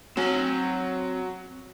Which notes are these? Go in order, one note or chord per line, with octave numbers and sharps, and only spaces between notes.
F#3 C4 G#5